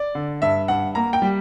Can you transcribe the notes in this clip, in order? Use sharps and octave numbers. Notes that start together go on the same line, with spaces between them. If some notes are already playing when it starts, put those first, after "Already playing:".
Already playing: D5
D3
G2 E5
G2 F#5
A#3 A#5
G5
G3